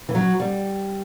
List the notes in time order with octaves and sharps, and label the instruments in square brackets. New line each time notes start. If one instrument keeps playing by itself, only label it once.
[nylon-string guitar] E3
F#3
G3